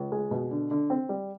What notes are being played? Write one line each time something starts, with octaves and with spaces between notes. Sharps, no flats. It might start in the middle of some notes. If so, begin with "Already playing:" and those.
Already playing: C#2
G#3
B2
D3
D3
C4
G3